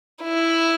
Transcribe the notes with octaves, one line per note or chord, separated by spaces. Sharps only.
E4